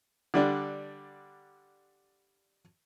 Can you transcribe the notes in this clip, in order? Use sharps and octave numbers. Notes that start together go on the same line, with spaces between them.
D3 G3 D4